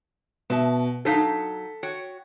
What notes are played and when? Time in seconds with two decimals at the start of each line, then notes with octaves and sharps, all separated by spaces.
0.50 B2 E5 A5
1.05 F#3 D#4 A4 F5 B6
1.83 F#4 C#5 G5